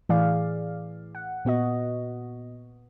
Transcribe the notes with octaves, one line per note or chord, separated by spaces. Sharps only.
A2 E3 G#4 D5 F5
F#5
A#2 B3 F#4 D#5